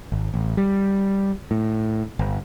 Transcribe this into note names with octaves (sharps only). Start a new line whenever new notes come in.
G#1
A1
G3
A2
G1